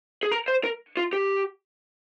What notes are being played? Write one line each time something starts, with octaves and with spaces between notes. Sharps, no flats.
G#4
A#4
C5
A#4
F4
G4